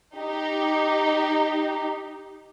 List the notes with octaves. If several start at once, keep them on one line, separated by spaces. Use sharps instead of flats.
D#4 G4